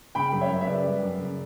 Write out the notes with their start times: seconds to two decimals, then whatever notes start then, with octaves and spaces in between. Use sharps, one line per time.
0.15 C#3 G5 B5
0.32 F#2
0.41 C#5 E5
0.50 F#2
0.61 E5
0.66 C#3 B4 D5
0.84 G3
1.02 F#2
1.19 C#3